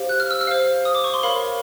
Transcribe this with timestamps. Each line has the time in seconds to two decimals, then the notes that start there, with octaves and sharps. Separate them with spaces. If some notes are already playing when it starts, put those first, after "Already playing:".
Already playing: G4 C5 F5
0.09 F#6
0.20 F6
0.31 E6
0.41 F6
0.47 C5 F5
0.85 D#6
0.95 D6
1.04 C#6
1.14 C6
1.23 A#4 C#5 F5 B5